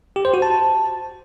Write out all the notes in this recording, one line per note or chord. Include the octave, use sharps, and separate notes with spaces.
G4
C5
F#4
A5